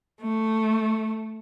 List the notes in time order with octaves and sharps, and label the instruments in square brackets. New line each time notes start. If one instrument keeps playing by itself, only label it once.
[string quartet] A3